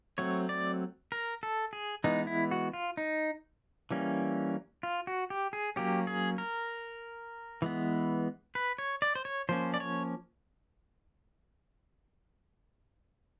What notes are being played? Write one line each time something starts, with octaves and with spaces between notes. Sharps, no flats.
F#3 A3 C4 C#5
D5
A#4
A4
G#4
E3 G#3 B3 D#4
E4
F#4
F4
D#4
E3 G3 A#3 C#4
F4
F#4
G4
G#4
F#3 A#3 C#4 G4
G#4
A#4
E3 G#3 B3
B4
C#5
D5
C5
C#5
F3 A#3 C#4 C5
D5
C#5